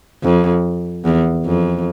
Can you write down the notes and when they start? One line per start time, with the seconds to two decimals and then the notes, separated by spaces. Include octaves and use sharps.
0.23 F2
1.05 E2
1.45 F2